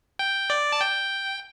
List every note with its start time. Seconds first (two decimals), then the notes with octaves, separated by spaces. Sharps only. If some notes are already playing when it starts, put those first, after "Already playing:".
0.19 G5
0.50 D5
0.72 A5
0.81 G5